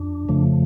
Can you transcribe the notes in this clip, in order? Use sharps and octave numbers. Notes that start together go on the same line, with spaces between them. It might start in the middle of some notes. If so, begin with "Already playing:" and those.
Already playing: F2 D4
F2 C#3 F3 A3